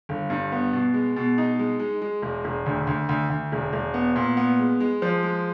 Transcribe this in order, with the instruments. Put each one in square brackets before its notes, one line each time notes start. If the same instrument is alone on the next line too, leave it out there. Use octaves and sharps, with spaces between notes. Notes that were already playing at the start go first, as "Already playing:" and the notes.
[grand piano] G1
G2
B3
B2
G#3
B2
D#4
G#3
G#3
G#3
E1
E1
D2
D2
D2
D2
E1
E1
B3
A#2
B3
G#3
G#3
F3
G#3